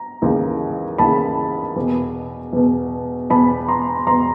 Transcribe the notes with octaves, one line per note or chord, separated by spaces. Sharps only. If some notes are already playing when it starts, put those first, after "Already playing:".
Already playing: A#5
D#2 C#3 E3
D#2 C#3 E3 A5 B5
E2 B2
E2 B2
E2 B2 A5 B5
A#5 C6
E2 B2 A#5 C6